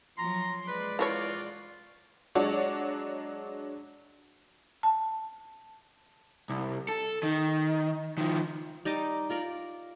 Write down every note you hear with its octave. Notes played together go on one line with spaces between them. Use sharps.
F3 F#3 A#5 C6
G#3 B4 D5
E3 F4 F#4 G#4 C#5
F#3 G#3 D4 F#4 C#5 D5
A5
C2
A4
D#3
D#3 F3
G3 D#4 D#5 D6
F4 A#4 D5